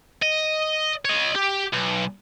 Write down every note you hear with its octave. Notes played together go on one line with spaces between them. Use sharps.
D#5
C#5 D#5
G4
B1